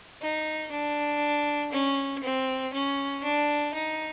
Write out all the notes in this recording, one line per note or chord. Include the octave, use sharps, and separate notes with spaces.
D#4
D4
C#4
C4
C#4
D4
D#4